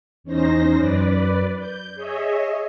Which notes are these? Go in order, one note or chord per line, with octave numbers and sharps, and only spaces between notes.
E2 C#4 D#4 C5 A#6
F#2 B4 D5
G6
G#4 C#5 D#5 E5